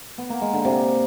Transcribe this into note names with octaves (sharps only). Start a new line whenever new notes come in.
B3
A#3
G#3
D3
C3